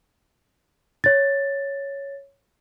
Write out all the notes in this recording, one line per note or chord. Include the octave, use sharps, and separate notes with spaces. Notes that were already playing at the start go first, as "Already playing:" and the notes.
C#5 A6